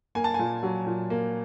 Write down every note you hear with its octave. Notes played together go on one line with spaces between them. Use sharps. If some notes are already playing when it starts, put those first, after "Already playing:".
A#3 G#5
A5
A#2 G#5
F#3
A#2
A#3